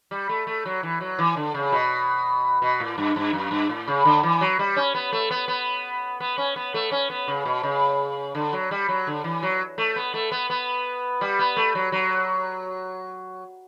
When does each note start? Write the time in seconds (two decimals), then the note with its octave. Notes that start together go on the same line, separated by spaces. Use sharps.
0.11 G3
0.29 A3
0.47 A3
0.65 F#3
0.83 E3
1.01 F#3
1.19 E3
1.37 D3
1.54 C#3
1.72 B2
2.62 B2
2.80 A2
2.98 G2
3.16 G2
3.33 F#2
3.51 G2
3.69 A2
3.88 C#3
4.05 D3
4.23 E3
4.41 F#3
4.59 G3
4.76 C#4
4.95 B3
5.13 A3
5.31 B3
5.48 B3
6.20 B3
6.38 C#4
6.56 B3
6.74 A3
6.92 C#4
7.10 B3
7.28 C#3
7.45 B2
7.63 C#3
8.35 D3
8.53 F#3
8.71 G3
8.89 F#3
9.07 D3
9.24 E3
9.43 F#3
9.78 A3
9.96 B3
10.14 A3
10.32 B3
10.50 B3
11.21 G3
11.39 B3
11.57 A3
11.75 F#3
11.92 F#3